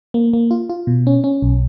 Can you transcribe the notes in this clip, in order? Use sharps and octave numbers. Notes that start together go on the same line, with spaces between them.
A#3
A#3
F4
F4
B2
C#4
C#4
B1